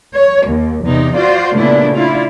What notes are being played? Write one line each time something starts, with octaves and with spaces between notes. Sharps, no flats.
C#5
D#2
E2 C3 E3 D#4
F4 F#4 C5 D5
A#2 C#3 A3 B3 D4 E4
D4 E4 F4